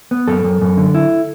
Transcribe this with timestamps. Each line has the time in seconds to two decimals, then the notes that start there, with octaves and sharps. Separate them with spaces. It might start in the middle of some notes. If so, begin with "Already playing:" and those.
0.11 B3
0.28 F#2 A4
0.44 F#2
0.62 F#2
0.77 D3
0.94 E4